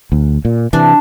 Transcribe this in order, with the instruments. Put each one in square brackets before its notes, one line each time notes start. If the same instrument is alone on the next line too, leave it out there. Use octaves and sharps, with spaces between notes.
[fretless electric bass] D2
A#2
[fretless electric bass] C3 E3 [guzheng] D4